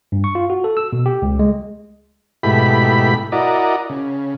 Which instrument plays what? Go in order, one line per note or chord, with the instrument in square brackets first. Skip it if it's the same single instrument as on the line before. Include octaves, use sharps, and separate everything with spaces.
[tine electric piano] G2
C#6
F4
F#4
A4
E6
B2
G4
C#2
G#3
[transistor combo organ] G#2 B2 A3 E4 G4 B5
E4 F#4 A#4 D5 D#5
C#3